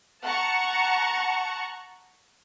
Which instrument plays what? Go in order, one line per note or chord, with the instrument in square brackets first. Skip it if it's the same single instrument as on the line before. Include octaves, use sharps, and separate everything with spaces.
[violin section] F#5 A5 A#5 C#6